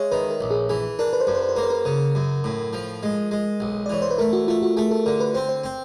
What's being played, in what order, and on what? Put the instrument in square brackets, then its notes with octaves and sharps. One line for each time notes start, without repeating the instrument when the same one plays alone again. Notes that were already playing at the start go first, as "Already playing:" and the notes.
Already playing: [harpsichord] G#3 [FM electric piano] C#5 E5
[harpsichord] D#3 [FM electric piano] B4
[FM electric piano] A#4
[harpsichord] A#1
[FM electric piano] G#4
[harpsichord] E3 [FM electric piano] G#4
[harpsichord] D4 [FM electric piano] A#4
[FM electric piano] B4
C5
[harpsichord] F#2 [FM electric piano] B4
[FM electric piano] C5
B4
C5
[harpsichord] A#3 [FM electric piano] B4
[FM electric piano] C5
B4
[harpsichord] C#3 [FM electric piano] A#4
[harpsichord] F#2
A2
F3
G#3
G#3
B1
[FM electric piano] D5
[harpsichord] E3 [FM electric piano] C#5
[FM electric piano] C5
B4
[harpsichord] A3 [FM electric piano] A#4
[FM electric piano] F#4
[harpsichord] A3 [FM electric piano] F4
[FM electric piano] F#4
[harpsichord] A3 [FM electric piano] G#4
[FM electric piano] A4
[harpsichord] D3 [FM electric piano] A#4
[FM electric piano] B4
[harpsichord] C4 [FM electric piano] C5
[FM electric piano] C5
[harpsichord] C4